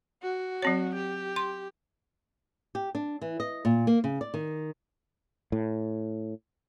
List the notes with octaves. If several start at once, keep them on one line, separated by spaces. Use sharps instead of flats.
F#4
F#3 C4 C#5
G4
C6
G4
D4
E3
D#5
A#2
A#3
C#3
D5
D#3
A2